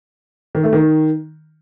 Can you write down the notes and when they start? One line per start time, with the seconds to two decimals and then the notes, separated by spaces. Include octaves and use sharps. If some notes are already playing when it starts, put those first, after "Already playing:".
0.55 D#3
0.64 A3
0.73 D#3